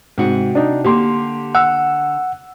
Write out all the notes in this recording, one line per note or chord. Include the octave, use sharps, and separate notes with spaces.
G#2 C3 F#4
D4 D#4
D3 A#3 G4 C6
F#5 E6